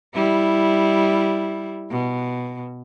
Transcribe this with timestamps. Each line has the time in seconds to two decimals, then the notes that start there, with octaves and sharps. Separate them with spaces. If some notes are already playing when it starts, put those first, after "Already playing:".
0.14 G3 E4
1.91 B2